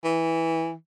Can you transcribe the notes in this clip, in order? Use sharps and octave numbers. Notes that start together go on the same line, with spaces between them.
E3